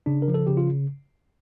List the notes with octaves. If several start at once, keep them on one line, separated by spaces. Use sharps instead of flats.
C#3 D4
A#4
F3
A4
C#3 G4
F4